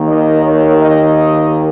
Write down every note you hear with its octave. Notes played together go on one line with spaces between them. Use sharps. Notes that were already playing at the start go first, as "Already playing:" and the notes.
Already playing: D#2 D#3 A#3
D#5
C#5
D#5